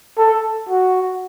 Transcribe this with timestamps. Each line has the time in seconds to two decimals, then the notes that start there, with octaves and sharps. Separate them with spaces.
0.18 A4
0.69 F#4